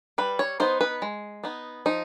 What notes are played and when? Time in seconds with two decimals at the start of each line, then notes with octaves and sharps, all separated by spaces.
0.18 G3 B4
0.39 C#5
0.60 B3 D#4 C5
0.81 B4
1.02 G#3
1.44 B3 D#4
1.86 F3 D#4